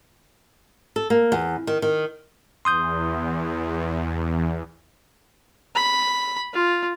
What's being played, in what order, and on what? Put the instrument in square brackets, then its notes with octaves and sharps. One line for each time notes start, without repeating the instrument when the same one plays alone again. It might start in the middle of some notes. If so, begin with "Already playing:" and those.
[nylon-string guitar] A4
A#3
E2
D#3
D#3
[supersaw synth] E2 [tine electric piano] C6 D#6 G6
[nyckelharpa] B5
F4